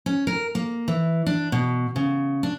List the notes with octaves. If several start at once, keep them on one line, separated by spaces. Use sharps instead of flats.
C#4
A#4
A#3
E3
D4
B2
C#3
D4